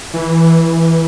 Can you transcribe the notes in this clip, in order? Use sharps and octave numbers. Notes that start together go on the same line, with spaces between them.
E3